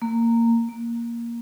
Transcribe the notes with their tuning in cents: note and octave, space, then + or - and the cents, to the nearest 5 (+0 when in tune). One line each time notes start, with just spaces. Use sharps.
A#3 -15
A#3 +5